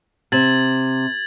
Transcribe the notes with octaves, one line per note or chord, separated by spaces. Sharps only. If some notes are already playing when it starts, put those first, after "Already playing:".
C3 G#6 A6 F#7